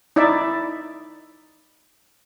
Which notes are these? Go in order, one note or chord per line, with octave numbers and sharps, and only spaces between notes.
D#4 E4 D5 E5